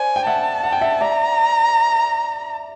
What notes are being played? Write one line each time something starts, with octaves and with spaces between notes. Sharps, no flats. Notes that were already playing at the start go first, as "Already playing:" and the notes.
Already playing: C5 D5 G#5
G5
E5 F#5 A5
F#5
G5
E5 F#5
D5 E5 A#5